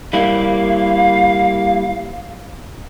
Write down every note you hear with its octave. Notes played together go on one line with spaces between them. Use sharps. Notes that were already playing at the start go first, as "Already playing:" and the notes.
G3 A#3 E4 F5